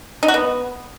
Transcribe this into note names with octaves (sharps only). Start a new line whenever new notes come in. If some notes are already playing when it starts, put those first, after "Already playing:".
D#4
F#4
B3